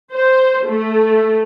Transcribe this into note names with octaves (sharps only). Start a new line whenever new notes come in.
C5
A3